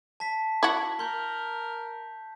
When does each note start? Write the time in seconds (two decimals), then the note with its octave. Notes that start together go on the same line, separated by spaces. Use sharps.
0.20 A5 B6
0.63 E4 F#4
0.99 A#4 C6 G6